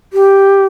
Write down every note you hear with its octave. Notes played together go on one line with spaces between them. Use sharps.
G4